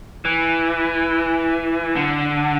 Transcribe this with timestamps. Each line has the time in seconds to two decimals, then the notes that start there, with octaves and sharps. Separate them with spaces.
0.25 E3
1.96 D3